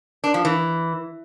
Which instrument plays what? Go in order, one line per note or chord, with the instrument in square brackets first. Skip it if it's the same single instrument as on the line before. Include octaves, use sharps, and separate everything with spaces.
[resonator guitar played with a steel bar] D4
F3
E3